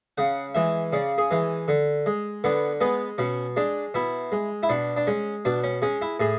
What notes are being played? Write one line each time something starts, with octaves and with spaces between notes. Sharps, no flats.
C#3 F#5
E3 G#3 E5
C#3 D5
G#4
E3 G#3
D3
G#3
D3 B3
G#3 B3
B2 C#4
G#3 D4
B2 E4
G#3
E4
B2 D4
D4
G#3 C#4
B2 D4
C#4
G#3 C#4
E4
A2 G#4